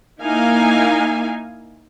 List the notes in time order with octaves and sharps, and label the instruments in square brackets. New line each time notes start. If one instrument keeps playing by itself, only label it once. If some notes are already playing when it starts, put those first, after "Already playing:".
[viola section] A#3 D#4 E4 F5 G#5